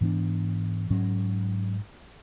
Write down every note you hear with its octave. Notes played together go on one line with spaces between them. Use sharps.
G#2 E3 B3 D4
G#2 F#3 C#4